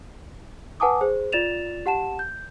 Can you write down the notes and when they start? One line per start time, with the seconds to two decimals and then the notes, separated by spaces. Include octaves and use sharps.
0.80 B4 F#5 G#5 A5 D6 D#6
1.01 G#4 C5
1.32 F4 D5 A6 E7 F7
1.86 G4 F#5 A5 E7
2.19 G6